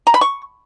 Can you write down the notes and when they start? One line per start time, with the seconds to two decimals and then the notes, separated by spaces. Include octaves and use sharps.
0.07 A#5
0.14 B5
0.21 C#6